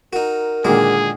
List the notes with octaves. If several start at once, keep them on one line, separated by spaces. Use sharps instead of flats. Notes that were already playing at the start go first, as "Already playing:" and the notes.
D#4 F#4 A#4
A#2 D3 D#3 G#3 F#4 G#4